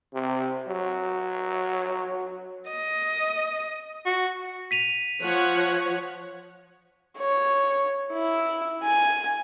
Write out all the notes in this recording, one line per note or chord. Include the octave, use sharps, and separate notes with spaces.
C3
F#3
D#5
F#4
B6 D#7 F7
F3 C#5 F#5
C#5
E4
G#5